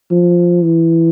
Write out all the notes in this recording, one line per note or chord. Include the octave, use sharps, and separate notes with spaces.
F3
E3